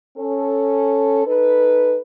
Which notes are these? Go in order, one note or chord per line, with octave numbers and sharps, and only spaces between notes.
C#4 A4
D#4 A4 B4